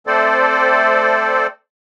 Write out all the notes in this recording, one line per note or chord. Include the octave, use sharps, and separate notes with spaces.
A3 C4 A4 C5 D5